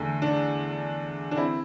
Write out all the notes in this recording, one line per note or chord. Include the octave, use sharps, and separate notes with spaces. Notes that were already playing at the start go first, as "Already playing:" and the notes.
Already playing: E2 D3 A3
D4
D4
C4 E4